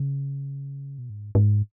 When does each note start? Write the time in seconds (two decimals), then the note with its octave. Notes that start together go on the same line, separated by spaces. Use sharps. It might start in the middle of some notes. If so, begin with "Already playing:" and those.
Already playing: C#3
0.98 B2
1.10 G#2
1.35 G#2